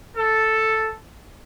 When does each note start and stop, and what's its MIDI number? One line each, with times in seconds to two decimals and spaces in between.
0.17 0.93 69